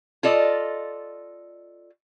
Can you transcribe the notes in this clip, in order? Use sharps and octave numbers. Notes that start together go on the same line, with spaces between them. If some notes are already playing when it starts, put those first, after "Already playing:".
F4 A4 D5 D#5